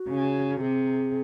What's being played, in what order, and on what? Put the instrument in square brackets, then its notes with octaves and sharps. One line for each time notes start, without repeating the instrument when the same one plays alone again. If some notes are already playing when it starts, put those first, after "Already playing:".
Already playing: [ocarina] F#4
[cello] C#3
[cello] C3 [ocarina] G#4